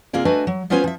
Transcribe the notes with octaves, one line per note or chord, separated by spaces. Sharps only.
C3 A#3 F4 G#4 D5
A3 D4 F#4 B4 D#5 G#5
F#3
B3 C#4 F4 B4 C5 G#5
F3 E5